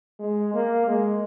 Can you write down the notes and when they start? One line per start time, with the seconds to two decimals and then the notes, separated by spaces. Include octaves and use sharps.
0.19 G#3
0.54 A#3
0.87 G#3